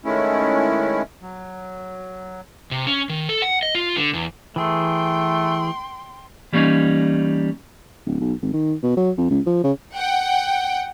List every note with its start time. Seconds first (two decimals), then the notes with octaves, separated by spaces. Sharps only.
0.05 D#3 G#3 A3 C#4 E4
1.22 F#3
2.71 C3
2.87 C#4
3.09 D#3
3.29 A4
3.42 F#5
3.63 D#5
3.75 F4
3.96 D3
4.13 E2
4.56 E3 A3 G#4 G5 C6
6.53 E3 G3 A#3 C#4 D#4
8.06 D1
8.21 B1
8.42 G#1
8.53 D#3
8.83 B2
8.97 F#3
9.17 F2
9.31 C#2
9.46 F3
9.64 C#3
9.94 F#5 G5